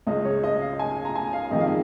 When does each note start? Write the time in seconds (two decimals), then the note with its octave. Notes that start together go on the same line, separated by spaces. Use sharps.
0.07 C#2 C#3 G#3 D#5
0.25 C#5
0.43 D#5
0.61 F5
0.79 G#5
1.05 A#5
1.15 G#5
1.33 F5
1.51 F2 D#3 G#3 D#5
1.60 F5
1.67 D#5